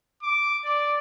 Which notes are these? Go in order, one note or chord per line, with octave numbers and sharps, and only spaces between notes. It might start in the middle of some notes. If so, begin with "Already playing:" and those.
D6
D5